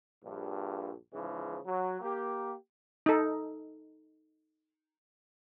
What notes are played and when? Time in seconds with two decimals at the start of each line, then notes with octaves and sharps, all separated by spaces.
0.24 A#1 G2
1.14 G#2 C#3 E3 F3
1.66 F#3
2.01 A#3 G4
3.06 D#4 A4